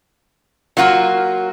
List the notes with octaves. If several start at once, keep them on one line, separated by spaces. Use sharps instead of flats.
F#3 A#3 F4 F#4